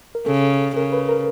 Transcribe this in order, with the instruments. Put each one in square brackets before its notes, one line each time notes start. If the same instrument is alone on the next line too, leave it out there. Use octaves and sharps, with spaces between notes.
[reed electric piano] A#4
[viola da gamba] C#3 [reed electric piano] A4
[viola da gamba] C#3 [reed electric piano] A#4
[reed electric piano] B4
A#4